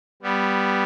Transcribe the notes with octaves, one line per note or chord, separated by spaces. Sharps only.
G3 B3